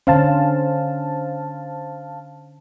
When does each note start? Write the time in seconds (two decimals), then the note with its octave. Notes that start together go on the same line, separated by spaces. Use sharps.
0.07 D3 C#4 C5 F5 A5